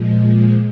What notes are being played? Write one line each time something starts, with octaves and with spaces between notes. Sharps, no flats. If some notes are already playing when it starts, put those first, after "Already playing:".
Already playing: A#2 F3 G#3